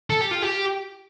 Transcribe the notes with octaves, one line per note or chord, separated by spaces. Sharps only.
A4
G4
F4
G4